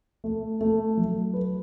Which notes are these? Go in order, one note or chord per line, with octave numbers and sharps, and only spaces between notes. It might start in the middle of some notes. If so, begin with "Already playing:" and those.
A3
A3
F#3
B4